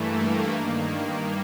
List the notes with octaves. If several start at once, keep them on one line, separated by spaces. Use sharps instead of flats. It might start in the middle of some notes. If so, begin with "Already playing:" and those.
Already playing: G2 E3 A3 A#3
G2 D#3